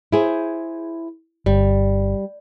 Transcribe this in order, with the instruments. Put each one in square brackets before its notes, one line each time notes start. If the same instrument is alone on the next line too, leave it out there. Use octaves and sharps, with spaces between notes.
[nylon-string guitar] E4 G#4 C5
[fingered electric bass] G1 [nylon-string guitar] G3